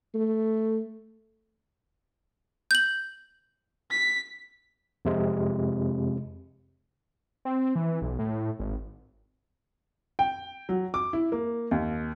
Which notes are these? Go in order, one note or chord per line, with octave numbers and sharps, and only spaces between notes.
A3
G6 F#7
B6
F2 C3 G#3
C4
E3
B1
A2
G#1
G5
F#3
D6
E4
A#3
D#2